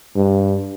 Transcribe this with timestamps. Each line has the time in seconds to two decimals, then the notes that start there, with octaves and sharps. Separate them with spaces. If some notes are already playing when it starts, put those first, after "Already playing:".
0.15 G2